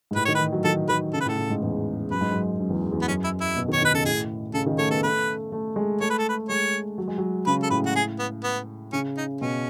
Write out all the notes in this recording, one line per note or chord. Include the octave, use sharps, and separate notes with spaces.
G#2
A2 B4
D#3 C#5
B4
E3
F#3
D#3 A4
D#3 B4
C#3 A4
B4
A2 A4
A2
G#2
E2
F#2 B4
G#2
F#2
F#2
E2
E2
B3
F#2 C#4
E4
E4
B2
D#3
C#5
D#3 B4
C#3 A4
A2 G#4
C#3 A4
D#3
A3 C#5
B3 A4
A3 B4
A3
G#3
A3 C#5
B4
A4
B4
G#3 C#5
F#3
G#3
F#3
C#3 B4
A4
A2 B4
F#4
G#4
B3
B3
C#3 C#4
D#4
B2 C#4